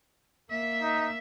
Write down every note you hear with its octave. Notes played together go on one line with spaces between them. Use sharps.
A#3 E5
D#4